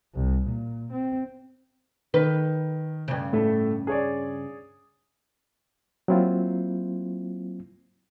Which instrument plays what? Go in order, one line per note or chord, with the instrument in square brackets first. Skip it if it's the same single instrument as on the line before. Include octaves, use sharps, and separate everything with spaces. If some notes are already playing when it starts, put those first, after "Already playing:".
[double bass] C2
A#2
C4
[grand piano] D#3 [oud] B4
[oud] G2 C#3
[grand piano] A2 A3 A4
G#4 C#5 D5
[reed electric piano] F#3 A#3 C4 E4 F4